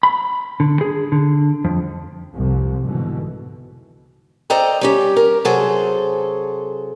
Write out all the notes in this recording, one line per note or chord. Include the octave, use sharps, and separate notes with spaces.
B5
D3
G#4
D3
F2
C2 F2 C3
G#2 B2 D3 E3
A4 C5 D5 D#5 G5 A#5
G3 C#4 G4
A#4
C3 F#3 G#4 A4 C5